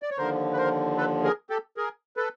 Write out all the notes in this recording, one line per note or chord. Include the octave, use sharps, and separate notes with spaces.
D5
C#5
D#2 D3 F3 A#4 C5
B4
A#4 C5
A4 B4
G#4 A#4
G4 A4
G#4 A#4
A4 B4